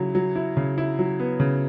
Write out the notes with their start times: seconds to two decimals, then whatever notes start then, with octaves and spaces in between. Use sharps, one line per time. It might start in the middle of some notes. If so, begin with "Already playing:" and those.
Already playing: C#3 F#3 E4
0.15 F#3
0.36 E4
0.57 C#3
0.78 E4
0.99 F#3
1.20 B3
1.40 C#3